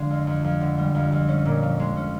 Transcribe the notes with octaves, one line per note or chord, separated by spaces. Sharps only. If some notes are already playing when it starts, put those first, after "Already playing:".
Already playing: D3 F3 G#3
F2
F2
F2
D3
G3
F2
F2
C#4
A#2
F3
G#3
C#4